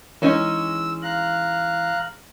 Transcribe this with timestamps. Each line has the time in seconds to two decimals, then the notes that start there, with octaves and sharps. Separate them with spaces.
0.22 E3 G#3 C#4 D#4 E6
1.03 F5 A#5 F#6